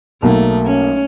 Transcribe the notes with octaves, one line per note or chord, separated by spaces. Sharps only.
B1 F#3 A3 A#3
C#4